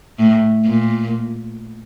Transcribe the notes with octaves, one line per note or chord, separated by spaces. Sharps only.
A2
A#2